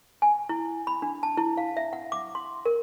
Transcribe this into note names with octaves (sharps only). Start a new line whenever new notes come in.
G#5
E4
B5
D4
A5
E4
F5
E5
F#5
D6
C6
A#4